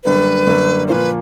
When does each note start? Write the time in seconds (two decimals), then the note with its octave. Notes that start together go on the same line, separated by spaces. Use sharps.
0.04 F#2 D3 G3 A#3 B4
0.46 F#2 D3 G3 A#3
0.88 A#2 F3 A#3 B4 C5